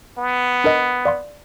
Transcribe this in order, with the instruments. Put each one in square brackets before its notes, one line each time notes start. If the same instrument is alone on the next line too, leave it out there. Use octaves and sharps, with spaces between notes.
[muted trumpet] B3
[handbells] D4 A#4 D#5
D5 F5 C6